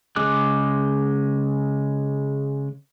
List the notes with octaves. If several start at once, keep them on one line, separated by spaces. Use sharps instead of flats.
C#3 G#3 D6 F#6